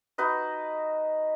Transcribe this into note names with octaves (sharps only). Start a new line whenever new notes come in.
D#4 F#4 B4 D#5